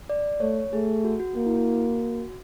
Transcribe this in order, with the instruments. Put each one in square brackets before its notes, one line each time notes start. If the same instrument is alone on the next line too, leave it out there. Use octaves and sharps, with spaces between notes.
[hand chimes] D5
[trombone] A3 [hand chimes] C#5
[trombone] A3 [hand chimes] G#4
[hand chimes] F#4
F#4
[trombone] A#3 [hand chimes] F#4
[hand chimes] E4
F#4